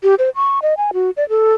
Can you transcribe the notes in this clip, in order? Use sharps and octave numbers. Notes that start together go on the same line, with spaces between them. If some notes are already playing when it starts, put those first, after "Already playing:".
G4
C5
C#6
D#5
G#5
F#4
D5
A4